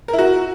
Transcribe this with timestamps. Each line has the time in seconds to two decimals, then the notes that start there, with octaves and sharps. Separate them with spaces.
0.08 A#4
0.13 E4
0.18 F#4